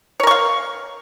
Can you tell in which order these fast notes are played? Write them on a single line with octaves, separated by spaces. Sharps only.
C#5 A#4 C#6 F5